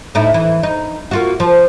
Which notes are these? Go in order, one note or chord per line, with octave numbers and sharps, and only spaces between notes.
A2 D#4 E4
E3 E4
D#4
A#3 F4 F#4
F3